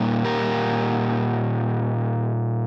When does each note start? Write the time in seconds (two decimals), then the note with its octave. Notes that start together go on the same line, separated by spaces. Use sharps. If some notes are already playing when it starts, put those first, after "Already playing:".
Already playing: A#2 G3 A#3
0.24 G4 A#4